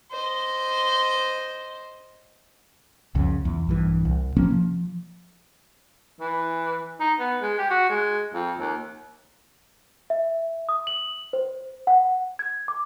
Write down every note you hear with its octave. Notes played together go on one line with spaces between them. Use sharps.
C5 D#5
C2 F2 C#3
E2
A#1 G2 E3
C2
C3 F3 A#3 C#4
F3
E3
D#4
B3
G#3
G4
F#4
G#3
F2
D#2
E5
D#6
F#7
C5
F#5
G#6
D6